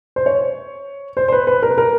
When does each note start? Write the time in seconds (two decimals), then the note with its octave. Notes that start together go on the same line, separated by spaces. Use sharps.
0.16 C5
0.26 C#5
1.17 C5
1.28 C5
1.32 B4
1.47 B4
1.63 A#4
1.71 B4
1.78 A#4